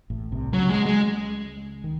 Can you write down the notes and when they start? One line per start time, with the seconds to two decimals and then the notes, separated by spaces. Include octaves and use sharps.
0.10 A1 A2
0.32 C2 C3
0.53 C#2 C#3 F#3
0.70 G#3
0.86 G#3
1.84 D#3